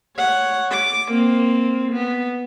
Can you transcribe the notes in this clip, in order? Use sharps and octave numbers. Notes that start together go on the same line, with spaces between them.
C#5 F#5
D6
A#3 C4
B3